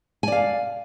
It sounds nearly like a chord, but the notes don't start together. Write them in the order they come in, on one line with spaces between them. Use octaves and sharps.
G#5 D5 F5